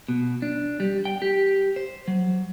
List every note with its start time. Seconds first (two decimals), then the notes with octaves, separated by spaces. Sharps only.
0.08 B2
0.42 D4
0.80 G3
1.05 G5
1.22 G4
1.76 C5
2.08 F#3